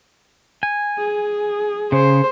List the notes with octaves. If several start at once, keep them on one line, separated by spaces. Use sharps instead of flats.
G#5
G#4
C#3 C5